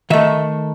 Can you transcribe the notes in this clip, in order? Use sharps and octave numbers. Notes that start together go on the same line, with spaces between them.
D#3 A3 E5